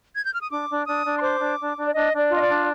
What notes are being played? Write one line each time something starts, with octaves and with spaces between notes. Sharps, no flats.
G#6
G6
F6
D#6
D4 D6
D4
D4 D#6
D4
C6
C5 D6
D4
D4
D4
D5
D4 D#5
D4
D5
F4
D#5
D5
D4